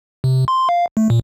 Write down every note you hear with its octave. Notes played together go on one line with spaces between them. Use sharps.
C3
C6
F5
A3
A#2